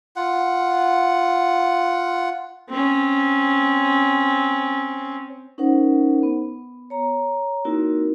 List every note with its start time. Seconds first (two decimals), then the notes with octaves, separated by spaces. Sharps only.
0.16 F4 F#5
2.69 C4 C#4
5.58 C#4 D#4 A#4 C5 F#5
6.23 B3
6.90 C#5 A#5
7.65 A#3 C4 D#4 E4 F#4 A#4